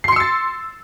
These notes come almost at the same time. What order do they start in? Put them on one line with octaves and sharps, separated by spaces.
C7 C6 C#7 E6 A6